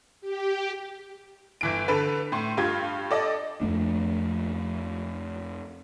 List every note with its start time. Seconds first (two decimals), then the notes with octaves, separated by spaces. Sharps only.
0.21 G4
1.61 G1 E3 D7
1.88 D3 A4 B4
2.32 A2 C6
2.57 G2 F4 G4 G#6
3.11 A4 D5 D#5
3.61 F2 A3 D4